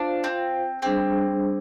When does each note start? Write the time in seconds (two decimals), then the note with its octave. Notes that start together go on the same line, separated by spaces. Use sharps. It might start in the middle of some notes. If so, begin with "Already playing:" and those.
Already playing: D4 F4 C5 F5
0.24 C4
0.82 G3 C4 D4 G#4 C5